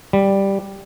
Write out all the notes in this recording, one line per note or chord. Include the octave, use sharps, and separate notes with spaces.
G3